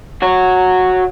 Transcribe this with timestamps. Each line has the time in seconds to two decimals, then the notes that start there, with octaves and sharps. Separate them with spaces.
0.22 F#4 C#5